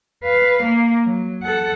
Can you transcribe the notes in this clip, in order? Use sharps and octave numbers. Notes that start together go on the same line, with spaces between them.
B4 F5
A#3
F#3
A4 F#5